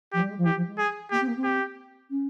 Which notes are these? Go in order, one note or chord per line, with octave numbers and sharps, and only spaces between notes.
F3 G4
G3
G#3
F3
E3 G4
F3
G#3
G#4
A#3 G4
C4
A#3
C4
G4
C#4